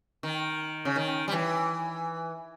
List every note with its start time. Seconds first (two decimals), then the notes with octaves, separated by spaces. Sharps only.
0.23 D#3
0.85 C#3
0.96 D#3
1.28 G3
1.32 E3